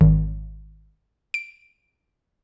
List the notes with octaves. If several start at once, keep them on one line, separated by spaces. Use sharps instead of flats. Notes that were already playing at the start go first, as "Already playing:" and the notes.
G#1
D7